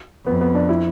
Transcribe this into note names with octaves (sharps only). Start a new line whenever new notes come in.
F2 B3
B3
D4
E4